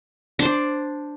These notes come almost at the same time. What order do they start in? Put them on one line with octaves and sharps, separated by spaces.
D4 C5 D5